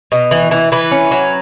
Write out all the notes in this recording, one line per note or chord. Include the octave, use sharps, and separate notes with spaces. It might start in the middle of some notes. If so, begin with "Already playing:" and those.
B2
E3
E3
E3 B4
C#4
F#3